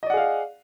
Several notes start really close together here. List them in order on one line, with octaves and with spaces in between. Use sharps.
D#5 D5 F#5 G#4 F5